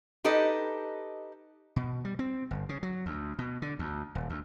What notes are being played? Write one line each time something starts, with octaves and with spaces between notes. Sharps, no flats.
D#4 G4 A4 B4 D#5
B2
G3
C4
G1
C#3
F#3
D2
B2
D3
D2
D#1
D2